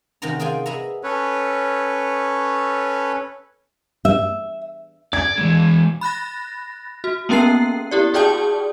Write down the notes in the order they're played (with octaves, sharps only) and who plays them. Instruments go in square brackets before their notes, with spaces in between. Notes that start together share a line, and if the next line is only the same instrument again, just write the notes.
[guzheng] C3 D#3 C#4 F#4 C#5 A#5
F4 G#4 D5 F5 G5 G#5
G#4 B4 D#5 E5 F#5 A#5
[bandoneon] C#4 A4 B4 C#5
[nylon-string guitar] E5
[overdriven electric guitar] D5 [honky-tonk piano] G#6
[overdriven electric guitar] E3 G#3
[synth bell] B5 F#6 A6 A#6
F#4
A#3 B3 C#4 A#4 G5 C7
E4 G4 D5
F#4 G#4 D5 G5 A5 D#6